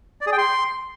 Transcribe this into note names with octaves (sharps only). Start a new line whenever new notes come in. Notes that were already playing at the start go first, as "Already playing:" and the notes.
D5
G#4
G5
C6